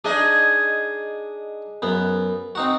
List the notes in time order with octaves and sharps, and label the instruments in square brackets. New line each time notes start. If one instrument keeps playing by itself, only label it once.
[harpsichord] D4 D#4 [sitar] G#4 D#5
[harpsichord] F#2 B3
C4 D#4 F#4